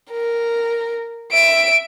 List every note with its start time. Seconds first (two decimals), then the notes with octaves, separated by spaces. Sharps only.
0.11 A#4
1.33 E5 D7